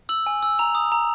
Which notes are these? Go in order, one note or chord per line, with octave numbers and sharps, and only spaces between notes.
E6 F#7
G#5
E6
A#5 F7
D#6
A#5